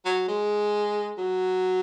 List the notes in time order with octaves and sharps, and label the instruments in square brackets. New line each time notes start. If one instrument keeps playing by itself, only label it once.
[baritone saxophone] F#3
G#3
F#3